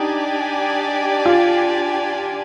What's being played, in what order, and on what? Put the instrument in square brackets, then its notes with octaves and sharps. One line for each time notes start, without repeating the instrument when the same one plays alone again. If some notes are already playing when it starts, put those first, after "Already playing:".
Already playing: [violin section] D4 G4 D5 G#5 [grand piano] D#4
[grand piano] F4